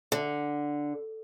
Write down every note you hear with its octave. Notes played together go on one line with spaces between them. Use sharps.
D3